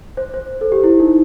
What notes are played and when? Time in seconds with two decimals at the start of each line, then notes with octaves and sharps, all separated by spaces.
0.17 C5
0.34 C5
0.61 A4
0.72 G4
0.83 E4
1.00 D#4